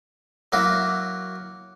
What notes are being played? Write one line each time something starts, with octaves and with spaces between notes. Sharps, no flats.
F#3 A#3 E4 F#4